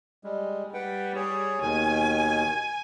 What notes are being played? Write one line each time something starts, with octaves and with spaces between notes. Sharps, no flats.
G3 G#3
G3 B4 F#5 G5
G#4 C#5
D#2 B2 D#3 G#5